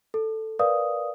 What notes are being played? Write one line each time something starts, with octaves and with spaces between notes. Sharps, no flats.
A4
A#4 B4 D5 F5 D#6